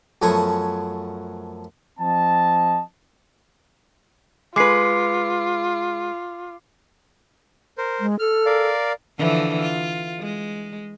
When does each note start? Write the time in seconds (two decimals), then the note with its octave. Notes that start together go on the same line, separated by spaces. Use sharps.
0.22 F#2 F3 A3 B3 G#5 C#6
2.00 F3 C4 D#5 A5
4.56 G#3 F4 B4 D6 C7
7.78 A#4 C5
8.00 G#3
8.19 A4 F6
8.46 A#4 D5 F5
9.18 D3 E3 F3
9.62 F4
10.20 G#3